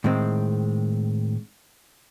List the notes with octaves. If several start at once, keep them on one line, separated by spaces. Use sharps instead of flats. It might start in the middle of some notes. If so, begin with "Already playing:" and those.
A2 D#3 G#3 C4